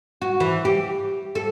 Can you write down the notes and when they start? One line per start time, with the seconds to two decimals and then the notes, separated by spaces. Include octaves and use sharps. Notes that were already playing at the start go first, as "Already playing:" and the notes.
0.22 F#4
0.40 E3
0.65 G4
1.35 A4